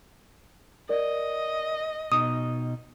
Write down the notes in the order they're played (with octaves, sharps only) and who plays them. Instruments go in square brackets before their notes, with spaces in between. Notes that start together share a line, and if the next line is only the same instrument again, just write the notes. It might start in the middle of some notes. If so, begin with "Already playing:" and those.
[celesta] A#4 D5 [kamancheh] D#5
[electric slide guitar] B2 D#4 [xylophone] D#6 [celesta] D#7